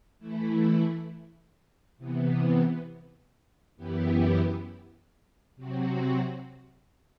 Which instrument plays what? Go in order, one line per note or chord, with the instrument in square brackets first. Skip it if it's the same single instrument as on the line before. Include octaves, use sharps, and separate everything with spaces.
[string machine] E3 A3 E4
C3 E3 B3
F#2 E3 B3 E4 G4
C3 F#3 C4 F#4